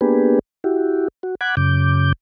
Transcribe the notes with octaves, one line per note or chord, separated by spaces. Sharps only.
A#3 B3 D4 G4 G#4 B4
E4 F#4 G4
F#4
F#5 B5 D6 F#6 G#6
F#2 C#3 D6 G6